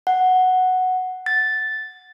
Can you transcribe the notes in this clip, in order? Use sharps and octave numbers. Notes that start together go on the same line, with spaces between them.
F#5
A6